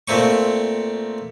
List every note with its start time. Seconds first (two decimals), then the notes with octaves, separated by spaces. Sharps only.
0.08 A#2 A3 A#3 C4 C#6